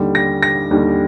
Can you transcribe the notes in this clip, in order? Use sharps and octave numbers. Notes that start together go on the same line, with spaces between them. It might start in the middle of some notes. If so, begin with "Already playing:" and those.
Already playing: D#2 D3 G3
A#6
A#6
D#2 D3 G3